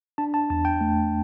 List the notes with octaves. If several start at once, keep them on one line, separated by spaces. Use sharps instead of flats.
D4 A5
A5
E2 A5
G5
A3